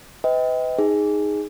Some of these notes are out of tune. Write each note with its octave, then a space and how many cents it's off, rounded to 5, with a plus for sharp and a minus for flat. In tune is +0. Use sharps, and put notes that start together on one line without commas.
B4 +40 D#5 +35 G5 +5
D#4 +0 G#4 -5